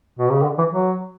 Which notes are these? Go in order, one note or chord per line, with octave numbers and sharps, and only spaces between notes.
B2
C#3
D3
E3
F#3